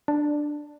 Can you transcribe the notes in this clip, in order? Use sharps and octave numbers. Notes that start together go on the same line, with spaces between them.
D4